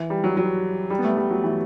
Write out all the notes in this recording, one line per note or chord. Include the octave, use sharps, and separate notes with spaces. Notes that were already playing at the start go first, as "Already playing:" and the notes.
Already playing: E3
G3
F#3
F#3
G3
B3
A3
G3
F#3
E3